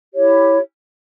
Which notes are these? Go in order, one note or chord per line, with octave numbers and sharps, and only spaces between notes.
E4 G4 C#5